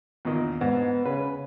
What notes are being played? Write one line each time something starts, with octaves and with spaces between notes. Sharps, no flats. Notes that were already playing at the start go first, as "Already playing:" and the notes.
E2 A#2 D#3
G#2 B3
C#3 B4